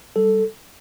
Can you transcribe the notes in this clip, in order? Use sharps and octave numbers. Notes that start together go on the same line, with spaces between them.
G3 A4